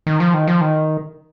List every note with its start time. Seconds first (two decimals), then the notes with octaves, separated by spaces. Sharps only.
0.07 D#3
0.20 F3
0.34 D#3
0.48 F3
0.61 D#3